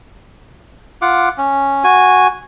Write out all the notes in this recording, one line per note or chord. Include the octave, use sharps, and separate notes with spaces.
F4 F#5 D6
C#4
F#4 G#5